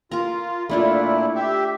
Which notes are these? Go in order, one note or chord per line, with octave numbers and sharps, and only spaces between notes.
F4 A#4 A#5
A#2 A3 D4 E4 F4
G4 E5